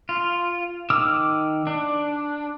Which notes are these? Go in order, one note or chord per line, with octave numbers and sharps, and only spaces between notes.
F4
D#3 D6 E6 F6
D4